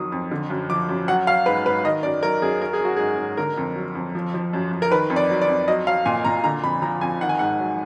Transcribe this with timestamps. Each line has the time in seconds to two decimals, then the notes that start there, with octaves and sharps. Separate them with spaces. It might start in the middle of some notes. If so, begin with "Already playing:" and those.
Already playing: F2 D#3 F#3 D#6
0.12 F2
0.31 D3
0.50 F#2
0.70 F3 D6
0.89 F#2
1.08 F#3 F#5
1.27 F#3 F5
1.46 G#2 B4
1.66 G#2 B4
1.84 D#3 D#5
2.03 F#2 D5
2.23 F#3 A#4
2.42 F#2 G#4
2.61 F#3 A#4
2.73 G#4
2.81 F#3 F#4
2.96 G#2 G#4
3.18 G#2
3.37 D3 A#4
3.57 F2
3.76 F#3
3.95 F2
4.15 F3
4.34 F3
4.53 F#2
4.72 F#2
4.82 A#4
4.90 D#3 B4
5.10 F2
5.16 D5
5.30 F#3
5.41 D5
5.48 F2
5.68 F#3 D#5
5.87 F#3 F5
6.06 A#2 G#5
6.25 A#2 A#5
6.44 D3 A#5
6.63 F2 B5
6.82 F3 A#5
7.01 F2 G#5
7.21 D#3 F#5
7.29 G#5
7.39 G#2 F#5
7.59 F#3